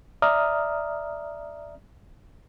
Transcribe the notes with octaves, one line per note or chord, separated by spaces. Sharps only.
D5 E5 A#5 D#6 F6